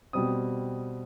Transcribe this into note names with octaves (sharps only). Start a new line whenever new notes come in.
B2 G3 C4 D#6